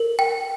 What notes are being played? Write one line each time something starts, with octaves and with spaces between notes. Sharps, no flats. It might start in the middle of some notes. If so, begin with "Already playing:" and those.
Already playing: A#4
G5